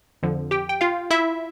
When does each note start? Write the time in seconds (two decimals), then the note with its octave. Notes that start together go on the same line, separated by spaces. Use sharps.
0.23 F2 D3 F3
0.51 G4 G5
0.69 G5
0.81 F4 F5
1.11 E4 E5